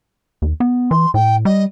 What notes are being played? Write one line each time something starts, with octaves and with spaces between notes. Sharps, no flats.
D#2
B3
E3 C6
A2 G5
G3 D#5